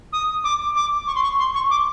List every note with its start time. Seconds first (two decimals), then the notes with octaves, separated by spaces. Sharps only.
0.13 D#6
0.44 D6
0.76 D6
1.07 C#6
1.15 C6
1.23 C#6
1.39 C6
1.55 C#6
1.70 D6